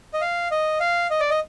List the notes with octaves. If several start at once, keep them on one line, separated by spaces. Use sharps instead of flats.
D#5
F5
D#5
F5
D#5
D5
D#5